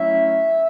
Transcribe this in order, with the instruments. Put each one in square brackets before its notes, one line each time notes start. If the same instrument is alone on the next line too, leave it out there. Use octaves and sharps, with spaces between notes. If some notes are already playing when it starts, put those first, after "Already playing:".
Already playing: [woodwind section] F#3 A3 C#4 E4 E5